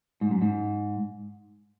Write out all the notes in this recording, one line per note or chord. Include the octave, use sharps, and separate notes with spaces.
G#2
F#2
G#2